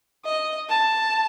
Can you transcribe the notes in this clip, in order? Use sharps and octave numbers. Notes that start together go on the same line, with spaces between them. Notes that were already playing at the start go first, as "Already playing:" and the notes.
D#5
A5